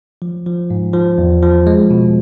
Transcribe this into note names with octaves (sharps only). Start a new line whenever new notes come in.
F3
F3
G#2
F3
E2
F3
G#3
B2